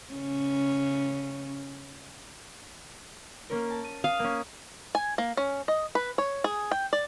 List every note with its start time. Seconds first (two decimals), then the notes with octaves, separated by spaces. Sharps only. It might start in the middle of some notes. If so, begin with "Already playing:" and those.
0.13 C#3 C#4
3.50 A#3 C#4 A#4
3.70 A5
3.84 D#7
4.04 F5 D#6
4.20 A#3 C#4
4.95 G#5
5.18 A#3
5.37 C#4
5.68 D#5
5.95 B4
6.18 C#5
6.44 G#4
6.71 G5
6.93 D5